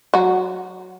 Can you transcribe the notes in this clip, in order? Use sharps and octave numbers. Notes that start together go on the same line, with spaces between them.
F#3 F#4